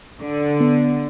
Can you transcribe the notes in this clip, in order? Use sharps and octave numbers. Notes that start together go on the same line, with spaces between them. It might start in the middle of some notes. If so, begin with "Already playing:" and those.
D3
B3